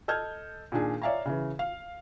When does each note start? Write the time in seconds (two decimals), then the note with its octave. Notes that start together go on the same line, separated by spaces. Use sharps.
0.08 A4 D#5 F6 G6 G#6
0.72 A#2 D#3 D4 G#4
1.02 C#5 D5 E5 F5 G#5 A#5
1.26 C#3 E3
1.59 F5